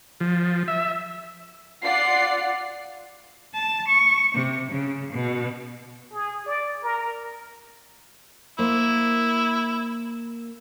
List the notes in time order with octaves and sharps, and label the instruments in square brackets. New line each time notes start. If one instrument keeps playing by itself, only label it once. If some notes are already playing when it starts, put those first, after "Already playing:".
[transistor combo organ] F3
E5
[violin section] F4 D5 F#5 C7
[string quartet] A5
C#6
C3
C#3
B2
[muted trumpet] G#4
D5
A#4
[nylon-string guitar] A#3 C5 [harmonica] E4